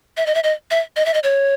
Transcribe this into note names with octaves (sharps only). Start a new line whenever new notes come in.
E5
D#5
E5
D#5
E5
D#5
E5
D#5
C#5